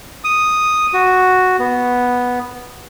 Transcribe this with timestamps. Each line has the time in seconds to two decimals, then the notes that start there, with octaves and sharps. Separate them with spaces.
0.24 D#6
0.93 F#4
1.59 B3